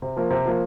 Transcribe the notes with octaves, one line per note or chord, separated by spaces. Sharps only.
C3
F3 A#3
C3
F3 A#3